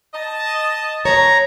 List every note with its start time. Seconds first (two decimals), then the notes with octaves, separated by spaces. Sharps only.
0.14 D#5 A5
1.05 C#5 A#5